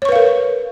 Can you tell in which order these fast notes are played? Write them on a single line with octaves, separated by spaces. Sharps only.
C#5 C#6 B4 F5 A#4